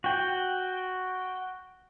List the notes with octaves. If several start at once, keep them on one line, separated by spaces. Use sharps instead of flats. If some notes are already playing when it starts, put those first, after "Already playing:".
F#4 G5